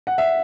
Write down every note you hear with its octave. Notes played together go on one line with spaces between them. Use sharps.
F#5
E5